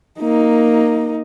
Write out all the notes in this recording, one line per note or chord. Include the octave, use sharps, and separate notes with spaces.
A#3 D#4